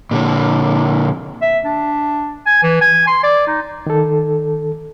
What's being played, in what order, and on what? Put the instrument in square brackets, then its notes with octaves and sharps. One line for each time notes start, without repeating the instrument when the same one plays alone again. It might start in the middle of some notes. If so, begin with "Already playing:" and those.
[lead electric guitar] A#2 D3
[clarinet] E5
D4
G#5
E3
G#5
C6
D5
D#4
[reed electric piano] D#3 A4